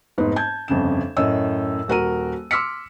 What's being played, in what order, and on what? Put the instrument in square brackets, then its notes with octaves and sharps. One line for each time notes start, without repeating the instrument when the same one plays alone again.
[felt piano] F1 G#2 B3
A5 G6 G#6
G1 F2 C#3 E7
F#2 A2 C#5 D#5 E6
D#1 F#4 A#4 D#7
C6 D6 E6 F6 B6 C#7